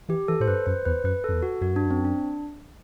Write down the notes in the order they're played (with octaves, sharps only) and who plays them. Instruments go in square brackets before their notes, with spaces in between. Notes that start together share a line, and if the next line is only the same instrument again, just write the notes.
[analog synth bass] E3 [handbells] G4
[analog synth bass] E3 [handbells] A4
[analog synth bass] A2 [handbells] C5
[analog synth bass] G2 [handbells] B4
[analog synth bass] F#2 [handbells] C5
[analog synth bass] E2 [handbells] B4
[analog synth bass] F#2 [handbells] B4
[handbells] A4
[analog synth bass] F#2
E2
[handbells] F#4
[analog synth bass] F#2 [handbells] F#4
[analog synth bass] G2 [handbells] D4
[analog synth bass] F#2 [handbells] C4
[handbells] D4